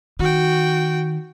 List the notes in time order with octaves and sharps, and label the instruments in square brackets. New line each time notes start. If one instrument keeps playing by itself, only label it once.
[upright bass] D#3 [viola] F#4 G5